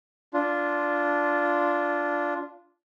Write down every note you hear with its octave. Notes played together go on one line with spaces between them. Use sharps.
D4 F4